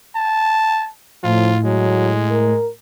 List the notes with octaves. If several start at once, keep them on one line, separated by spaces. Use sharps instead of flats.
A5
A2 F3 F4
F#3 G#3
A#4